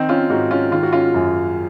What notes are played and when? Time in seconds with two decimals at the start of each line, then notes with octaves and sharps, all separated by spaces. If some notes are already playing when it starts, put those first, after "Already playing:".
Already playing: D#3 C4 D#4
0.09 C#4 F4
0.29 G#2 D#4 F#4
0.51 C#4 F4
0.71 D#3 F4
0.83 F#4
0.92 C#4 F4
1.14 F#2